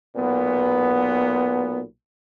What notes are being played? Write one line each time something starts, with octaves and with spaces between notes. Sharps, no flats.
B1 A#2 B3